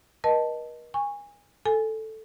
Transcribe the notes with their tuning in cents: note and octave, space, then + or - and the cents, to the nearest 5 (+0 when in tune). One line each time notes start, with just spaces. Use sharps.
A#4 +45 D#5 -5 A5 +0
G#5 -25 C#6 +0
A4 +0 G#5 +0